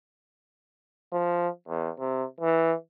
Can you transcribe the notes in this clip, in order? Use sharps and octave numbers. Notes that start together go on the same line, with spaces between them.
F3
E2
C3
E3